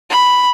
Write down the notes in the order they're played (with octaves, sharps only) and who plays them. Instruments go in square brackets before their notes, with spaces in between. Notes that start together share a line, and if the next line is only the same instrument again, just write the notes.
[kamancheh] B5